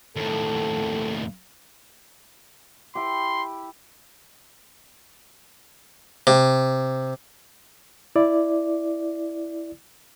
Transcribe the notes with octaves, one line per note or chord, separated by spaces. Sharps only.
D#2 A2 A4
E4 G4 C6
C3
E4 D5